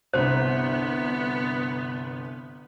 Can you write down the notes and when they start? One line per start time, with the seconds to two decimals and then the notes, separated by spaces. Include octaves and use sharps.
0.13 G1 C2 B3 C5